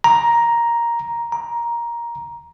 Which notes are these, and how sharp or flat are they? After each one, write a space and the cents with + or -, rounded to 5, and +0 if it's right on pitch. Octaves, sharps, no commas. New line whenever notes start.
A#5 +5
A#5 +10